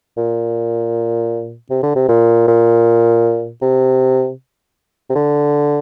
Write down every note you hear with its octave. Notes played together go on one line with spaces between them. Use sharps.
A#2
C3
D3
C3
A#2
A#2
C3
C3
D3